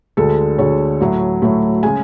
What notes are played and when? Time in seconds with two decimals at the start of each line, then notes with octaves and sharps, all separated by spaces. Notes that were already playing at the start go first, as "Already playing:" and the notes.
0.17 D2 D3 G#3 A4
0.58 D2 D3 G#3 C#5
1.00 A2 F#3 A3
1.42 A2 F#3 A3
1.83 C#3 G#3 G#5